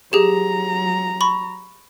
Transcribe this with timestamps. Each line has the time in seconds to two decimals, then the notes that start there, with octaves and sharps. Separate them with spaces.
0.13 F#3 G4 G#4 A#5
1.21 B5 C#6